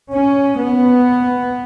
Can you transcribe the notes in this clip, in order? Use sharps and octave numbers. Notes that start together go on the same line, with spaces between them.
C#4
B3